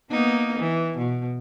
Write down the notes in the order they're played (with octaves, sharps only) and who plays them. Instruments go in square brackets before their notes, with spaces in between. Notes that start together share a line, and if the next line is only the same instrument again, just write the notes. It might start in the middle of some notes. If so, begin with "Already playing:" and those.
[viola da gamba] A#3 B3 D#4
E3
B2